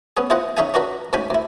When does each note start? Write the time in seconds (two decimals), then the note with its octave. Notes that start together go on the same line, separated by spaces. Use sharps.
0.17 B3 C#4 G#4
0.30 E4 F4 G#4 C5 D#5 F#5
0.57 C#4 D#4 G#4 E5 F5 G#5
0.74 C#4 D4 F#4 A#4 B4
1.13 D2 G#2 C#4 G5 G#5 B5
1.30 D2 E4